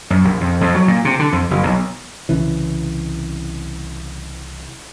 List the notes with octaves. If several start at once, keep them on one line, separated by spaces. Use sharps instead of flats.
F#2
A#1
F2
F2
F#3
A#2
C3
D3
F2
F#1
B1
C2 C#3 E3